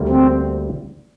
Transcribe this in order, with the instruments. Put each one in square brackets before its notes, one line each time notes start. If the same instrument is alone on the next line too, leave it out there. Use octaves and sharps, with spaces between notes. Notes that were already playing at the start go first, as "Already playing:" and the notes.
Already playing: [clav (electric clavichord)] D2 D3 G3 A#3
[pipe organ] C4